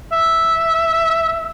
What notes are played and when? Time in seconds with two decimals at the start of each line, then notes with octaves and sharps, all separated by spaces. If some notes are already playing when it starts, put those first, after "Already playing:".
0.12 E5